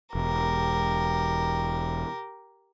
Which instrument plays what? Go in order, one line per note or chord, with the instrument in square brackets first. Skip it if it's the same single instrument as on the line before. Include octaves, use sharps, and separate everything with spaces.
[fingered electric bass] E1 [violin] G4 A#4